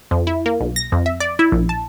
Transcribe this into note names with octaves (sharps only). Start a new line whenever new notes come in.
F2
E4
A#3
B1
A#6
F2
E5
D5
E4
A#1
A5